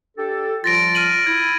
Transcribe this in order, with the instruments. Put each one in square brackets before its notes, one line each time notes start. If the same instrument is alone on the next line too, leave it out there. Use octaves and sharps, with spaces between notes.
[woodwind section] D4 G4 A4
[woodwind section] F3 G3 F4 [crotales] A6 A#6 D7
[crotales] F6 D#7 F#7
[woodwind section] E4 [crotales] G#6